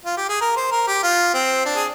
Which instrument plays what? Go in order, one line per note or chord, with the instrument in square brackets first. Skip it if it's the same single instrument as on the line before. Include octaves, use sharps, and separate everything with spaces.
[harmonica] F4
G4
G#4
A#4
C5
A#4
G4
F4
C4
D4
G#4